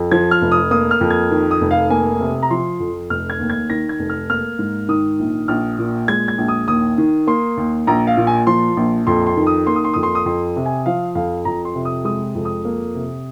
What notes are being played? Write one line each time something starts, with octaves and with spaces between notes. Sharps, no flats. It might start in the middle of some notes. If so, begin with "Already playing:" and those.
Already playing: F2
F3 G#6
F6
F1
D#6
A#3 D#6
F6
F2
G#6
D#3
D#6
F1
F5
A#3 G#5
C3
A#5
F3 C6
F2
F1 F6
G#6
D#2
G#6
D#3 A#6
G#6
F1
F6
A#3 F6
G#2
D#3 D#6
A#1
A#1 F6
A#2
G#3 G#6
G#6
A#1
D#6
D#2 D#6
D#3
A#3 C6
D#2
A#1 A#5
F5
A#2
G#5
F3 C6
A#1
F2 C6
C6
D#3
D#6
A#3 C6
D#6
C6
F2 D#6
C6
D#6
F2 C6
C3
G#5
F3 F5
F2 F5
F2 A#5
C6
C3
D#6
G#3 D#6
F2
D#6
A#3
C3